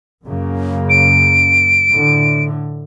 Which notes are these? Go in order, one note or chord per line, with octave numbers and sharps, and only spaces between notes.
F#2 C#3 A#3
D7
A2 D3